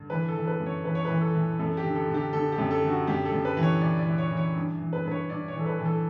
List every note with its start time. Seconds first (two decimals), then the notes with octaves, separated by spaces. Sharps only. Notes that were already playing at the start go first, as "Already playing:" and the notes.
Already playing: G2 D3
0.10 E3 B4
0.28 A4
0.36 E3
0.47 B4
0.60 F#2
0.66 C#5
0.85 E3 B4
0.95 C#5
1.05 E3 B4
1.21 A4
1.35 E3
1.59 F#2 A4
1.77 G4
1.84 D3
1.95 A4
2.08 D3
2.14 G4
2.33 D3 A4
2.52 G4
2.58 F#2
2.71 A4
2.83 D3
2.89 F#4
3.07 F#2 G4
3.25 A4
3.32 F#2
3.45 B4
3.57 E3
3.63 C#5
3.81 E3 D5
3.99 D5
4.06 E3
4.18 C#5
4.31 E3
4.37 C#5
4.56 G2
4.80 E3
4.93 B4
5.05 G2 B4
5.11 C#5
5.30 G2 D5
5.48 C#5
5.55 E3 A4
5.66 B4
5.79 E3
5.85 A4